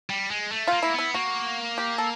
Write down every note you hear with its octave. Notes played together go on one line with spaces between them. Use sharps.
G3
G#3
A3
F4
A#3
E4
B3 E4
A#3 F#4
G4
A4